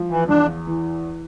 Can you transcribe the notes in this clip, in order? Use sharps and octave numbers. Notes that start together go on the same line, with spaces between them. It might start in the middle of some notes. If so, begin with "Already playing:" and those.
Already playing: F3
E3
E2 D4
E3